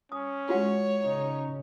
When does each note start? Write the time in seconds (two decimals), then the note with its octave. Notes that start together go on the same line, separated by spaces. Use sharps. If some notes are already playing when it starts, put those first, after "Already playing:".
0.12 C#4 D#6
0.49 G#3 F4 F#4 C#5 F#5
1.02 C#3 C#4 D#4